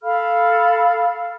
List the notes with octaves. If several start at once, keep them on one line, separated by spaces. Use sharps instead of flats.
A4 F5 B5 F6